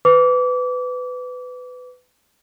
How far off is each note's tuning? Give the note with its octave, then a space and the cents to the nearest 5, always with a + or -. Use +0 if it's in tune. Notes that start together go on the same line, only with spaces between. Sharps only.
B4 +20 D6 -30